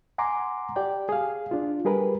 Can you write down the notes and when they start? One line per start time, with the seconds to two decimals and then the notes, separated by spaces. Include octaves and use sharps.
0.18 F#5 G#5 A#5 C6 D6
0.76 G4 D5 G5
1.09 G#4 F5
1.51 D4 F4
1.85 G3 G4 G#4 A#4 B4